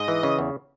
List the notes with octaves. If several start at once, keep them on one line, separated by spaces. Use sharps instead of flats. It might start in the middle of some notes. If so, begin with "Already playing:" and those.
Already playing: G#2 D#5
E3
C#3
E2